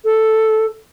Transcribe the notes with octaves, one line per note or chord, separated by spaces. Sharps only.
A4